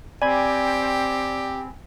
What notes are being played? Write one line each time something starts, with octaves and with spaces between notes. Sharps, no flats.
C4 G4 D5 G#5 B5 G#6